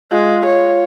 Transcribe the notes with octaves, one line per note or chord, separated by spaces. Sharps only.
G#3 F4
C#5